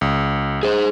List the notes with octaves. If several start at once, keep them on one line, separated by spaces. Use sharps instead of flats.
C#2
G#4 C5